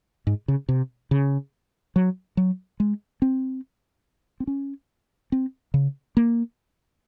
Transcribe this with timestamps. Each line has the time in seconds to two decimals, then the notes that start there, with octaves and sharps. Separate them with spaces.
0.27 G#2
0.48 C#3
0.69 C3
1.11 C#3
1.96 F#3
2.37 F#3
2.80 G#3
3.22 C4
4.40 C4
4.47 C#4
5.32 C4
5.74 C#3
6.17 A#3